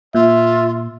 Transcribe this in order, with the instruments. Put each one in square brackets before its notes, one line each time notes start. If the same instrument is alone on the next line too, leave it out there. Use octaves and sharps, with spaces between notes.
[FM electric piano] A#2 [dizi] F4 [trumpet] E5